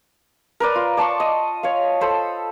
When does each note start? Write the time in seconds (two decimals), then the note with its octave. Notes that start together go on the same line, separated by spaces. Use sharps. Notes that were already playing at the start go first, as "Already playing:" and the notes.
0.60 A#4 B4 D5
0.75 F4
0.97 D5 A5 C6 C#6
1.20 D#5
1.63 C#5 F5
2.01 A4 C5 B5